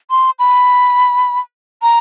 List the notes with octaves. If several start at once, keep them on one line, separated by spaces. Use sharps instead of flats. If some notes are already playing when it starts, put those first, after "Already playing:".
C6
B5
A#5